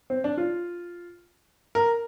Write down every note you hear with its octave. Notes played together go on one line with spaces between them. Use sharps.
C4
D4
F4
A#4